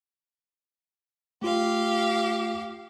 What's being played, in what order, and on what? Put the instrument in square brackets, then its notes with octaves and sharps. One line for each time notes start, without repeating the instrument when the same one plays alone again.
[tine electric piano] A3 F4 [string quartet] G4 F5